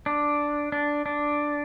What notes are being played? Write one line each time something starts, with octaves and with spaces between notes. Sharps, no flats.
D4
D4
D4